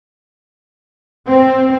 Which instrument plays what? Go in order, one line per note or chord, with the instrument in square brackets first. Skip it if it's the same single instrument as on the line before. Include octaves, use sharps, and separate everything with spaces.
[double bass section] C4